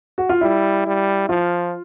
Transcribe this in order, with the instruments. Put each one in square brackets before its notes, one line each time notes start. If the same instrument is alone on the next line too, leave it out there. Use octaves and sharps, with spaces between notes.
[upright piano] F#4
F4
[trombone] G3 [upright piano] E4
[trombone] G3
[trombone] F3 [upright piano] F4